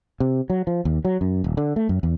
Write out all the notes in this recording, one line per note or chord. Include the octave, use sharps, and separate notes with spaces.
C3
F#3
F3
D#2
F#3
F#2
D#1
D3
A3
F#2
E2